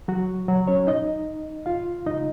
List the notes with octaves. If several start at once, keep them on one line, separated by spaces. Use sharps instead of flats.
F#3 F#4
F#3 F#4
C#4 C#5
D#4 D#5
F4 F5
D#4 D#5